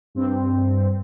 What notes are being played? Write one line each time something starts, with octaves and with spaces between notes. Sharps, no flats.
G2 C4